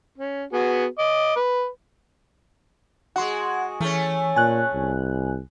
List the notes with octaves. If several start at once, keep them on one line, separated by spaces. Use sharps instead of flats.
C#4
B3 F#4 G#4
D#5 D6
B4
G#3 F#4 F#5 C6
E3 A3 C#4
A#2 G#5 F#6
C2